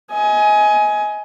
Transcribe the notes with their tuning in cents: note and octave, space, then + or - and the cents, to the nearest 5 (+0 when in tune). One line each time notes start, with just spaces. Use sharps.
D#5 +30 G#5 +15